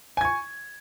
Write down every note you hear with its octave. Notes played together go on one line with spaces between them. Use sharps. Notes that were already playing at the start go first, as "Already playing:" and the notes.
G#5 C#6 G#6